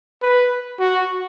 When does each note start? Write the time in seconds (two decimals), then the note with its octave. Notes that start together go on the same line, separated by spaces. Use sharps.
0.22 B4
0.79 F#4